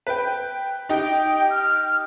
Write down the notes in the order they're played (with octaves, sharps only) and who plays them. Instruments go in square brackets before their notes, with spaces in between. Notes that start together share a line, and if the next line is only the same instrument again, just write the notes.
[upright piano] B4 G5
[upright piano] D#4 G4 D#5 [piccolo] G5
[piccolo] F6